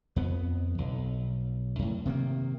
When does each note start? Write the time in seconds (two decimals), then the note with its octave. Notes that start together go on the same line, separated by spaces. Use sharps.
0.16 F2 B3
0.78 B1
1.79 F#2 A2
2.05 C3 D#3 G3 A#3